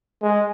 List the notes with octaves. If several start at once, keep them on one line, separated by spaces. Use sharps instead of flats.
G#3